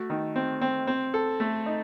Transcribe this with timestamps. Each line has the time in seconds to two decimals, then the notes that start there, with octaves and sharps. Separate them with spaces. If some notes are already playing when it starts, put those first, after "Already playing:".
Already playing: A3 F#4
0.10 D#3
0.36 C4
0.61 C4
0.87 C4
1.14 A4
1.40 A3
1.66 D#4